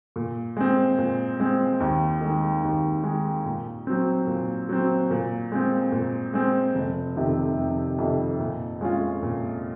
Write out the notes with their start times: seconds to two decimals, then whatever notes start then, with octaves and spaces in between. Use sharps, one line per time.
0.16 A#2
0.57 G#3 C4
0.98 A#2
1.40 G#3 C4
1.80 D#2
2.21 D#3 G#3
2.63 D#2
3.04 D#3 G#3
3.45 A#2
3.87 F#3 C4
4.27 A#2
4.69 F#3 C4
5.11 A#2
5.52 G#3 C4
5.92 A#2
6.33 G#3 C4
6.75 F1
7.16 F2 C3 D#3
7.58 F1
7.98 F2 C3 D#3
8.39 A#2
8.81 G#3 C#4 F4
9.23 A#2